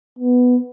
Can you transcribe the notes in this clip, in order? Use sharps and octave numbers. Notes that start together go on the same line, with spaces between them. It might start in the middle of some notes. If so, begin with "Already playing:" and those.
B3